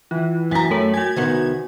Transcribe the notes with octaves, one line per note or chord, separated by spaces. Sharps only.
E3 F4
F#2 G5 G#5 A#5 B6
A3 A#4 C#5 F#7
F#4 G#5 G#6
C2 D#3 B3